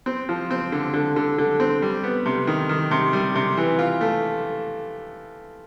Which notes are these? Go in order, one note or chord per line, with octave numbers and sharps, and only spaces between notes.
C4
F3
C4
D3
D3
D3
D3
C4
G3
B3
C3
D#3
D#3
C3
G3
C3
E3
F4
A3